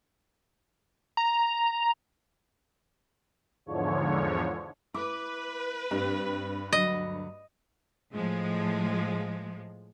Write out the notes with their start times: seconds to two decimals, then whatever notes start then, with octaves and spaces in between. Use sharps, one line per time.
1.17 A#5
3.66 E2 G#2 D3 F3 C#5
4.94 E4 B4 D6
5.91 G2 C4
6.73 D2 F#3 D#5
8.14 A2 F3 G#3